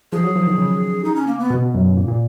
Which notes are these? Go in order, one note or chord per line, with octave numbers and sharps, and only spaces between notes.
F3 G#4
F#3
F3
D#3
C#3
D#4
C#4
A#3
B3
B2
B2
F#2
F#2
A#2
A#2